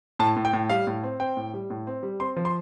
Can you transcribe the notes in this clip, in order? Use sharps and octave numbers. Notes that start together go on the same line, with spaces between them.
A2 A5
A2
G5
A2
G3 F5
A2
C4
C4 G5
A2
G3
A2
C4
G3
C4 C6
F3
C6